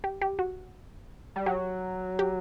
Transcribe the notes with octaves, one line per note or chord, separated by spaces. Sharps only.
G4
G4
F#4
G3
F#3 G4
G4